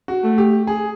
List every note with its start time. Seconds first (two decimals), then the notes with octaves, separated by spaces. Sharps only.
0.08 F#4
0.23 A3
0.38 G4
0.67 G#4